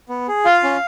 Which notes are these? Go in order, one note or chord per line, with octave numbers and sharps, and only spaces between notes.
B3
G#4
F4 F5
C#4